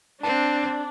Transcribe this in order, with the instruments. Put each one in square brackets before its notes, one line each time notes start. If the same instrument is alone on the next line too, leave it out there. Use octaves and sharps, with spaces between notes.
[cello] C4 [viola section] D4 [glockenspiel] A5